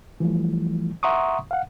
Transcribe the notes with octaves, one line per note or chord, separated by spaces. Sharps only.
E3 F3 G3 A3
E5 F#5 A#5 C6 C#6 D#6
F5 F#5